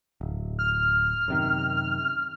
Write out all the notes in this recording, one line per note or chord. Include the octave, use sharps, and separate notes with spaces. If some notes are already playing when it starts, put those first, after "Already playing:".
D1
F6
F#2 C3 D#3